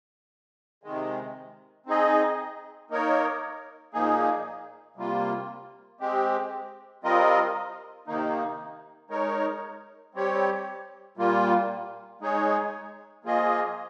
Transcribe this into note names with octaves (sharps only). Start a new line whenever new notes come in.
C3 D#3 G#3
C4 D#4 G#4 D#5
A#3 D#4 A#4 C#5
A#2 F3 A#3 D#4 G#4
C3 G3 A#3 F4
G#3 C4 G4
G3 C4 F4 A#4 D#5
C3 D#3 A#3 D#4
G#3 D#4 A#4 C#5
G3 C4 G4 C#5
A#2 G3 A#3 F4
G#3 D#4 G#4 C#5
F3 A#3 F4 G#4 D#5